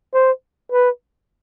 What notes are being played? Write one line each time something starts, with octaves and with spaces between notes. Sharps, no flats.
C5
B4